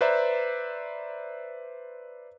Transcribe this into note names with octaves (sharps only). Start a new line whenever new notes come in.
B4 C5 D5 E5 A#5